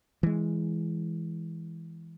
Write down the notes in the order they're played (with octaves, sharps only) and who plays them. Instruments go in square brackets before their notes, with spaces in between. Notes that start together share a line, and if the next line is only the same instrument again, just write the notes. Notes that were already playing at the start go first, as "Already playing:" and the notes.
[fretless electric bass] E3 G#3